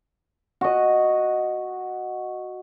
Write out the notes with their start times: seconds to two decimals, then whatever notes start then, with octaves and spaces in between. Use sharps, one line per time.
0.61 F#4 D#5